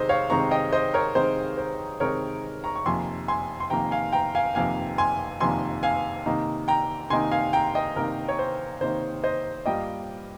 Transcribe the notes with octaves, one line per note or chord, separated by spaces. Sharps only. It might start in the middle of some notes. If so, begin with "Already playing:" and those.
Already playing: C3 D#3 G#3 C5 D#5
C#5 F5
C3 D#3 G#3 C4 D#4 A#5 C#6
D#5 G5
C5 D#5
A#4 C#5
C3 D#3 G#3 C4 D#4 C5
C5
C3 D#3 G#3 C4 D#4 A#4 C#5
A#5 C#6
C#6
F2 C3 D#3 A#3 G#5 C6
G#5 C6
C6
F2 C3 D#3 A#3 G5 A#5
F5 G#5
G5 A#5
F5 G#5
F2 C3 D#3 A#3 F5 G#5
G#5 C6
F2 C3 D#3 A#3 G#5 C6
F5 G#5
C3 D#3 A#3 D#4
G5 A#5
C3 D#3 A#3 D#4 G#5 C6
F5 G#5
G5 A#5
D#5 G5
C3 D#3 A#3 D#4 A#4
C#5
C5
C3 D#3 A#3 D#4 C5
C5 D#5
G2 G3 A#3 F4 D#5 G5